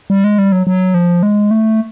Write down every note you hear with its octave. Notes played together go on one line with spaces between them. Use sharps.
G3
G#3
G3
F#3
F#3
F3
G#3
A3